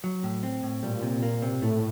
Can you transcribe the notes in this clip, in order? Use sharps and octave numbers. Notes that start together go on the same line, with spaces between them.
F#3
A2
C4
A2
A#2 G3
C3
A#3
C3
A2 A3